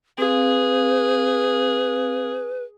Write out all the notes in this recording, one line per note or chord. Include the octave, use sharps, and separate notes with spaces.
C4 G#4 B4 F5